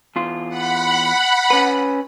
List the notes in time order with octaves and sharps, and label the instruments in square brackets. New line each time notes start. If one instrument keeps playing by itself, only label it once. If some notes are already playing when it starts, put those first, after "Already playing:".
[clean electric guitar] E2 F4
[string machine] F#5 B5
[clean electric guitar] C#4 B4